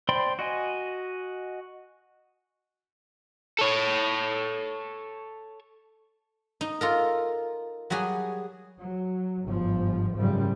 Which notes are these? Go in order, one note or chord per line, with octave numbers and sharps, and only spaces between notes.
C5 D5 G5 B5 C6
F#4 D#5 G#5
A4 C#5
D#4
F4 A4 A#4
F#3 G3 F#4 G#4
F#3
G1 G#2 F3
G#1 F#2 A2 C#3 F3 G3